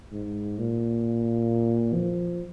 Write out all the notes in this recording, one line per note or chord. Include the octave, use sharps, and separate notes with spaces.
G#2
A#2
F3